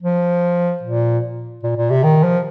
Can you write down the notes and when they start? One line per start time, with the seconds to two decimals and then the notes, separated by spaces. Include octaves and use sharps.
0.03 F3
0.83 A#2
1.63 A#2
1.77 A#2
1.90 C3
2.03 D#3
2.24 F3